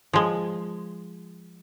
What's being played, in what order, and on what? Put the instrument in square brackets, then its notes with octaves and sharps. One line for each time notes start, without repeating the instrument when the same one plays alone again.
[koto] F3 G#3